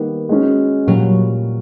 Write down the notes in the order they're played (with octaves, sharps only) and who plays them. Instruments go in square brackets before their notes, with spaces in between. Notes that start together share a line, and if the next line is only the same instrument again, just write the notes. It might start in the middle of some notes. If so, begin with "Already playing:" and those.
Already playing: [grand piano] D#3 G3 A#3 [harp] B3
[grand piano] G#3 C#4 F#4
[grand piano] A#2 G3 [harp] F#3